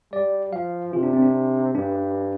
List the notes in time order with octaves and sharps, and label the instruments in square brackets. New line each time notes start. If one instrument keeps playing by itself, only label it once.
[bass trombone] G3 [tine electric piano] D5
[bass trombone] F3 [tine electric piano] F5
[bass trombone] C3 [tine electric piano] F4
[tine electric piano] D4
C4
D4
[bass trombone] G2 [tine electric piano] D4